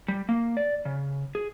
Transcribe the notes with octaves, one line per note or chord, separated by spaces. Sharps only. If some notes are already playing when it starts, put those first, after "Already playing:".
G3
A#3
D5
C#3
G#4